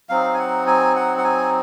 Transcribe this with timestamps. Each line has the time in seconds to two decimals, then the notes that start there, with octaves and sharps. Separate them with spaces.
0.09 F#3 C4 D#4 F5
0.34 G#5
0.39 F#5
0.67 G#5
0.96 F#5
1.18 F#5
1.24 G#5